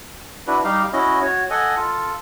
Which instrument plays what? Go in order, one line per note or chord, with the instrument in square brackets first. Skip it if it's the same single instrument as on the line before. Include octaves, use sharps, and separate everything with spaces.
[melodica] D4 E4 F#4 B4
G3 D#4 G4 F5
C#4 E4 F#4 D#5
F#4 C#5
A4 D#5 F#5 G#5
F4 A4